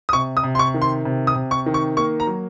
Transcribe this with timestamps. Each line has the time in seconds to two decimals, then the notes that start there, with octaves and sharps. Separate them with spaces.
0.09 D#6
0.13 C3 C#6
0.37 D#6
0.43 C3
0.55 C6
0.59 C#6
0.74 D#3
0.82 C6
1.05 C3
1.27 D#6
1.35 C3
1.51 C#6
1.66 D#3
1.74 C#6
1.97 A#3 C#6
2.20 A#5
2.27 F#3